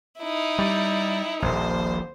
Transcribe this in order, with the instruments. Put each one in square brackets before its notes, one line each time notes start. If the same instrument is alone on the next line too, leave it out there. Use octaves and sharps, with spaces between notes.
[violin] D#4 E4
[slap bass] G3
[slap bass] D#1 A#1 [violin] C5